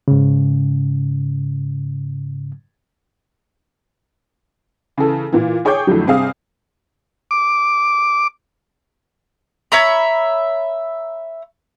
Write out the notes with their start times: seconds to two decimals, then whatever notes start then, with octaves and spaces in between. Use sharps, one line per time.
0.08 G#2 C#3
4.98 C#3 E3 A4
5.32 A#2 E3
5.65 G#4 C#5 G5 D6 G6
5.87 F2 A2 D3 F3 F#3
6.07 G2 C3 C4 G#4 F5 D#6
7.31 D6
9.72 C#5 E5 A#5 B5